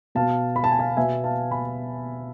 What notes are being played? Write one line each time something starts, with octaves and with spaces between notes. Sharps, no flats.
B2 B3 F5 A5
B5
A5
G#5
F5 A5
B2 B3 E5 G#5
F5 A5
G#5 B5